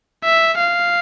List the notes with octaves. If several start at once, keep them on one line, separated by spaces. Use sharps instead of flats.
E5
F5